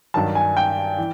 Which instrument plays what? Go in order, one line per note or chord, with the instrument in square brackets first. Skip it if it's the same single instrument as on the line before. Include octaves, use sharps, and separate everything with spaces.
[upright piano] G2 D#3 F#3 A5
G#5
G5
E3